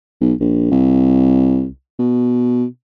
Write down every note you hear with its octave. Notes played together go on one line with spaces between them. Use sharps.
B1
A#1
C2
B2